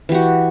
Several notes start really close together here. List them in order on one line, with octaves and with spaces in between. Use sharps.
E3 G4 F#4